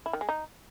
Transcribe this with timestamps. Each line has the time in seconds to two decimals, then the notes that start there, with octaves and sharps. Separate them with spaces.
0.06 E4
0.13 D#3
0.21 G#3
0.29 D#4